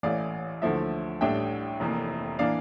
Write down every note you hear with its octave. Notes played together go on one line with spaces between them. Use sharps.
A1 A2 E3 D5 F5
D2 D3 F3 A3 E4 E5
A1 A2 G3 D4 E5 G5
F1 F2 E3 A#3
E3 A#3 D4 D5 F5